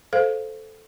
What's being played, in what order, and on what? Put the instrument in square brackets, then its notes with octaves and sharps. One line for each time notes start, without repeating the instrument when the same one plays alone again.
[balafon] A4 C5 F5